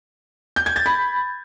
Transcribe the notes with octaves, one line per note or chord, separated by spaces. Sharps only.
G6
G#6
A6
B5